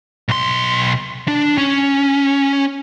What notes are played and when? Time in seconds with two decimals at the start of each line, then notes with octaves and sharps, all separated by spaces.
0.29 B1 C6
1.28 D4
1.58 C#4